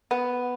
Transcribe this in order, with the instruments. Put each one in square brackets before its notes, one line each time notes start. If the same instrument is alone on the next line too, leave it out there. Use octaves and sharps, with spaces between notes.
[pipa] B3